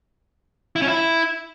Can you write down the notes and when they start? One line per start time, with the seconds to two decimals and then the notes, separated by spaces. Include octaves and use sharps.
0.76 E4
0.82 C#4
0.88 E4